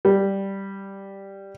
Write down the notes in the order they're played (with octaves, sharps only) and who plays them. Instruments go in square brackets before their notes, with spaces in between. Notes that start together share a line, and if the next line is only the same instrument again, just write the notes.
[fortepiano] G3